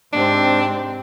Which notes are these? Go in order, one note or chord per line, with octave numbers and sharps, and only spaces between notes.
G#2 C3 C4 D4